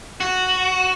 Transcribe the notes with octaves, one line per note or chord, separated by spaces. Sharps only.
F#4